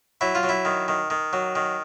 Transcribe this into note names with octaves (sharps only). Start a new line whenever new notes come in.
F#3 E4
F4
F#3
E4
D#3
D#3
D#3
F#3
D#3